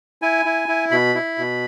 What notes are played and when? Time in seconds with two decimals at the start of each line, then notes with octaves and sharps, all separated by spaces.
0.22 E4 G#5
0.45 E4
0.68 E4
0.91 B2 B5
1.15 E4
1.38 B2